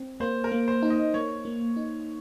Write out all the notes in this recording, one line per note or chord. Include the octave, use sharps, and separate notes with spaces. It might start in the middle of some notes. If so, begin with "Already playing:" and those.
Already playing: C4
A#3 C5
A#4
A#3
C5
D#4
D#5
A#3 C#5
A#3
D#4